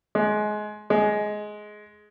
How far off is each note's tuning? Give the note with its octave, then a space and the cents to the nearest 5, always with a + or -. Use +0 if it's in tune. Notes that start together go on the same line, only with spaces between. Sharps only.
G#3 +25
G#3 +15